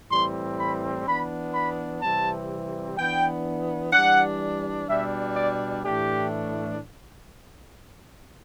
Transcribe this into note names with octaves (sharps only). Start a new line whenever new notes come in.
A2 E3 G3 C4 C6
B5
E3 B3 D4 B5
B5
C3 E3 G3 C4 A5
E3 B3 D4 G5
E3 G3 D4 F#5
B2 G3 D4 E5
D5
A2 E3 A3 D4 G4